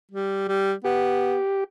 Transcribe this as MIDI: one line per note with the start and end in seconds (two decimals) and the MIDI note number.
0.12 0.48 55
0.49 0.73 55
0.85 1.37 59
0.85 1.64 67